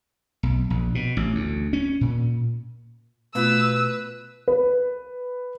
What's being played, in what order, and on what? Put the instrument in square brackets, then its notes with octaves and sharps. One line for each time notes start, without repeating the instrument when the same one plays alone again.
[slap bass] B1
A#1
B2
A1
D2
C#4
A#2
[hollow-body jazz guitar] B2 [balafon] A3 F4 [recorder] B4 [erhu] E6
[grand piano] B4